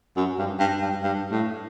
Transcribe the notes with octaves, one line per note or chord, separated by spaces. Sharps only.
F#2
G2
G2
G2
G2
A2